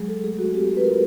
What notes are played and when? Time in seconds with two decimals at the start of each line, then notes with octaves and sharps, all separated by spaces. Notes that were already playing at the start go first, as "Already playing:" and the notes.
Already playing: F#3 G#3 G#4
0.08 A4
0.23 A3 G#4
0.39 F#4
0.54 C4 G4
0.69 G#4
0.77 B4
0.84 F4 A#4